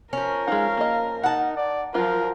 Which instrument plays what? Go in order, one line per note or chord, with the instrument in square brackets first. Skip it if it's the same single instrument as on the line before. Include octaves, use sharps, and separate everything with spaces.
[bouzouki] F3 C#4 [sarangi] A#4
[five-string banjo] G#3 D#4 [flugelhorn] F5
[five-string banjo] A#3 D#5
[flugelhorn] D#4 [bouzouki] F#5 A5
[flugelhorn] D5
[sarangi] F3 [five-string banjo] F#3 F4 [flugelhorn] A#4